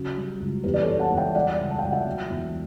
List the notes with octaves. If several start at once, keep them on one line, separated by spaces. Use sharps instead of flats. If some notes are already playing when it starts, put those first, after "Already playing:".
Already playing: C#3 F#3
G3
C#2
E2 G4 B4
D5
A4 C#5
E2
F#5 A5
E2
E5 G5
G3 D5 F#5
C#2
A5
G5
C#2 F#5
E5 G5
F#3
E2